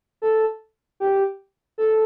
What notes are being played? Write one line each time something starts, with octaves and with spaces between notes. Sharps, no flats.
A4
G4
A4